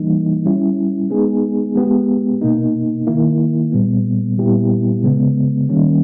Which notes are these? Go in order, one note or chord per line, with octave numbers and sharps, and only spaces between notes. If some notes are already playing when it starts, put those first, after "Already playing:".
Already playing: E3 G3 A#3 D#4
G3 C#4 E4
G#3 B3 D#4 G#4
G#3 B3 G4
B2 A#3 D#4
D#3 A#3 E4
A#2 G3 B3
A#2 G3 B3 E4 G4
C#3 G#3 B3
D#3 G3 A#3 C#4